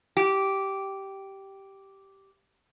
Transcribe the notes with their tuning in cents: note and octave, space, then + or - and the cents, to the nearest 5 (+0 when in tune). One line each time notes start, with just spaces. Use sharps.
G4 -10